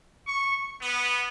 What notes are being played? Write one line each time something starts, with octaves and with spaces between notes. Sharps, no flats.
C#6
B3